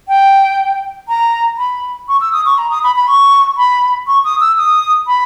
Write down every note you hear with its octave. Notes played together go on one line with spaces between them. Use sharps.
G5
A#5
B5
C#6
E6
D#6
C#6
A#5
D#6
B5
B5
C#6
B5
C#6
D#6
E6
D#6
B5